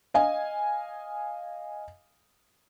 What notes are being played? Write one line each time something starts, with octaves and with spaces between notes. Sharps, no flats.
D#5 F5 G#5